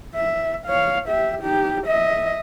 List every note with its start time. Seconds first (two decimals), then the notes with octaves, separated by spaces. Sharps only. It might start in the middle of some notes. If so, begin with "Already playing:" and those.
0.15 E5
0.67 C#5 F5
1.09 G4 E5
1.42 D#4 G4
1.87 D#5 E5